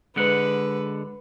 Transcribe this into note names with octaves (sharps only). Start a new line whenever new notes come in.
D3 G#3 B4 F#5